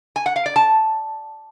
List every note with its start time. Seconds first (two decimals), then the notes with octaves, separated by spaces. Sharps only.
0.16 G#5
0.26 F#5
0.36 F5
0.46 D5
0.56 A5